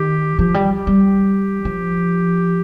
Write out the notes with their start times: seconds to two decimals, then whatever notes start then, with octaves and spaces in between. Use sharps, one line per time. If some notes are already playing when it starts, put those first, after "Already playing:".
Already playing: D#3 G4
0.39 F3 G4
0.54 G3
0.87 G3
1.65 F3